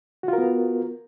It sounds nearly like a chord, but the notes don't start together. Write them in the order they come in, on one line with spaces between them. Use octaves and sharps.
F#4 F4 A#4 B3